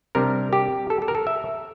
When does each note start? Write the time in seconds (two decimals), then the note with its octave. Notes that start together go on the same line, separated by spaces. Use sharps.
0.15 C3 G3 D4 A#4
0.53 G4
0.90 A4
1.02 A4
1.08 A#4
1.15 A4
1.27 E5